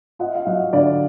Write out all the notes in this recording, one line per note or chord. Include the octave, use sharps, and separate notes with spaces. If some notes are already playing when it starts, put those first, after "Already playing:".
F4 D#5 F#5
F5
F#3 D#5 F#5
D3 D5 F5